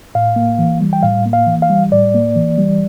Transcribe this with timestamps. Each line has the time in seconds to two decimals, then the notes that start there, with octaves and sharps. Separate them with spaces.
0.15 A2 F5
0.36 A#3
0.59 E3
0.80 G3
0.93 G5
1.03 A2 F5
1.26 A#3
1.33 F5
1.47 E3
1.62 F5
1.70 G3
1.92 A2 D5
2.14 A#3
2.36 E3
2.58 G3